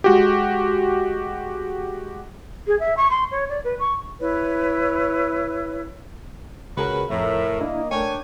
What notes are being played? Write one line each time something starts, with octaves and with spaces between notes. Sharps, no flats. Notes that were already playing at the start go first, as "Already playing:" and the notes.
G#3 F#4 G4
G#4
E5
C#6
C6
C#5
D5
B4
C#6
E4 B4 C#5
C#2 C#4 F#4 G#4 A#4 B4
F2 A2 A#4 E5
A#3 D4 E4 D#5
A3 D4 A#4 C#5 G5 G#5